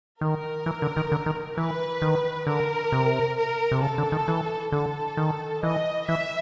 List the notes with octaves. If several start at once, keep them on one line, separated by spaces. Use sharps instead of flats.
D#3 A#4
E3
D3
D#3
D3
D#3
E3 B4
D#3
D3 A#4
C3
A#4
C3
C#3 A4
D3
D#3
E3
D3 A4
D#3
E3 D#5
E3 E5